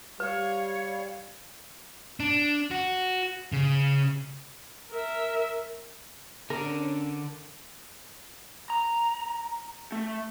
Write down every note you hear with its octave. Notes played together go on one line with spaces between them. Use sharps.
G3 B4 C#5 F5
D4
F#4
C#3
A#4 E5
D3 C#4 D4 A#4
A#5
A3